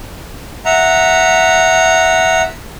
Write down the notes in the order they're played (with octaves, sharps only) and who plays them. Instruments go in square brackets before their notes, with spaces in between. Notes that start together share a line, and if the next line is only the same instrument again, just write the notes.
[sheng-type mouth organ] E5 F#5 A#5